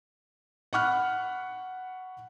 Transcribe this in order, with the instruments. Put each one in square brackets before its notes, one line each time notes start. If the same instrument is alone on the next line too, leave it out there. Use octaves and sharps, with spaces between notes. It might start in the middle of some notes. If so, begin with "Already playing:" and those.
[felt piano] F#5 B5 C#6 F6 F#6